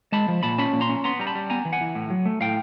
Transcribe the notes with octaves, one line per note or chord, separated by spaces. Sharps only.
G#3 A5 B5
F3
A#2 A5 B5
C#4 A5 B5
A#2
A#5 C6
C#4
B3 A#5 C6
G3 A#5
A5 B5
G3
B3 G#5 A#5
E3
F#5 G#5
E3
A2
F#3
A3
A2 F5 G5